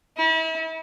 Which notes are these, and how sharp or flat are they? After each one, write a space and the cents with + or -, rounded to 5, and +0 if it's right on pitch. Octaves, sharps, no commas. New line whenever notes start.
E4 -40